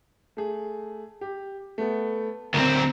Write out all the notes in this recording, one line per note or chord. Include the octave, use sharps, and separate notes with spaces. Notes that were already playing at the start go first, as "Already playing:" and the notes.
A3 G#4
G4
A3 B3
D2 C4 A#4